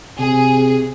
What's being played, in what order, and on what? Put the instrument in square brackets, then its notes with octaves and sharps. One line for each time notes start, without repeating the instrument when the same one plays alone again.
[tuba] C3 [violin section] G#4